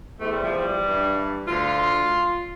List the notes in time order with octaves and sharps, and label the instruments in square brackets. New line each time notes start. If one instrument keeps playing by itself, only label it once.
[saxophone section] E2 C3 E3 A3
G3
F3
G3
G2 E3
D2 D3 F4